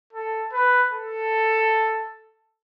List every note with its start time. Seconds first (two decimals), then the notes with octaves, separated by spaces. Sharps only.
0.13 A4
0.53 B4
0.93 A4